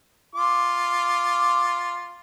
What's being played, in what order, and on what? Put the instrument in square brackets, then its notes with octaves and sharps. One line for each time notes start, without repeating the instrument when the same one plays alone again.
[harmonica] F4 D6